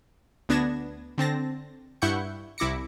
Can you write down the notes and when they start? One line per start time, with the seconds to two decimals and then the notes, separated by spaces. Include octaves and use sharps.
0.49 D2 B3 D4 G#6 A#6 E7
1.18 D3 C4 A5 A#6
2.02 G2 E4 F#5 C#6 G6 C#7
2.58 C2 E4 D6 A#6 C#7